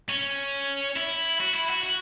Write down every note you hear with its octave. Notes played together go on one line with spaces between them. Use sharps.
C#4
E4
F#4
E4
F#4
F#4